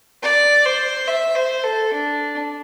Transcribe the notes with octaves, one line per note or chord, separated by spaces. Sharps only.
D5
C5
E5
C5
A4
D4